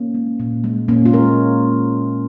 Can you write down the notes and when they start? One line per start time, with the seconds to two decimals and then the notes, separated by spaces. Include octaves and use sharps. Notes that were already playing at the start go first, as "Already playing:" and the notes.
Already playing: A#3 C#4
0.14 G#3
0.40 A#2
0.64 G#3
0.88 A#2 A#3 C#4
1.06 C#4 F4
1.13 G#3 A#4